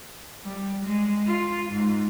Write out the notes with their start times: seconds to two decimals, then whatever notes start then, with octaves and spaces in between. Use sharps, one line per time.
0.45 G3
0.85 G#3
1.26 F4
1.72 G#2